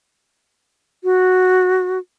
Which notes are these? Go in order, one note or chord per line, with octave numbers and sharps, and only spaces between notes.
F#4